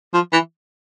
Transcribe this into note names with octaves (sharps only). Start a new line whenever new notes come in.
F3
E3